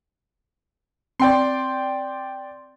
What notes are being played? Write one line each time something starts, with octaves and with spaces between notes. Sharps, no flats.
C4 D5 G5 C6